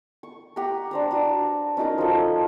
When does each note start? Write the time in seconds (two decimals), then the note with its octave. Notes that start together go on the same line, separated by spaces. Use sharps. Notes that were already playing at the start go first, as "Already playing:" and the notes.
0.23 C#6
0.56 G4 F#5 A#5
0.91 D4 C5 A#5
1.11 D4 F#4 B4 F#5
1.77 C#4 D#4 F#4 A#4
1.98 F3 A4